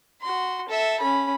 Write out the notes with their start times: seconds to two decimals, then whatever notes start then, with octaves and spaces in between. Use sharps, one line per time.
0.22 F#4 C6
0.68 A4 E5
1.00 C#4 B5